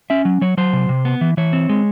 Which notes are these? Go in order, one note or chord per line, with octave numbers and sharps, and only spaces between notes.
C#4 E5
F#3
F#3 C#5
F#3 C5
C3
C3
B3
E3
E3 C#5
C4
G#3